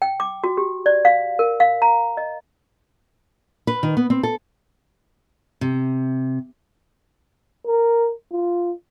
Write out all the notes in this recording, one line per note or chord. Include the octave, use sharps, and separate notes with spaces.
G5
D6
F#4
G4
D5
F5
A#4
F5
A#5
D#5
B4
D#3
B3
C4
A4
C3
A#4
F4